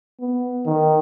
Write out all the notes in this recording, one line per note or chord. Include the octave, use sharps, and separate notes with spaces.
B3
D#3